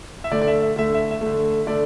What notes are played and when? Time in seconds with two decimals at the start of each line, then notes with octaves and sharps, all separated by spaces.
0.24 E5
0.31 D3 A3 D5
0.42 D5
0.47 E5
0.62 E5
0.76 D3 A3 E5
0.94 E5
1.11 E5
1.21 A3
1.26 D3
1.67 D3 A3 D5